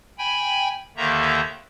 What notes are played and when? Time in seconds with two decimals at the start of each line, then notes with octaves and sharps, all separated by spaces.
0.18 G5 G#5 B5
0.97 D#2 D3 D#3 A#3 E5 A#5